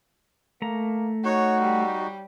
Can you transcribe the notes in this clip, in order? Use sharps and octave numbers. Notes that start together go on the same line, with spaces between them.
A3 A#3 A#5
D#4 F#4 C#5 F#5
G3